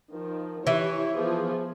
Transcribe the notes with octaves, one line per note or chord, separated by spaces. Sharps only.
D#3 F3
E3 E4 G4 C#5
F3 B3 G#4